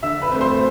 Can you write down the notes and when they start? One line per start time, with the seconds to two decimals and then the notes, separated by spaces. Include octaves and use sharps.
0.03 D3 E5 E6
0.22 B4 B5
0.31 A3 C4
0.41 C5 C6